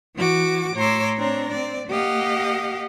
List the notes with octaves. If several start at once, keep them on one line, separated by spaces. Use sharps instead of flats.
E3 F#4 D6
A2 C#5 A#5 C6 D6 E6
C4 D4 C#5 A#5
C4 D5
A#3 G4 D#5 F5 F#5